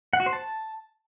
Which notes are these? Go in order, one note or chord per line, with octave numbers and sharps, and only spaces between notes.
F#5
F#4
C5
A5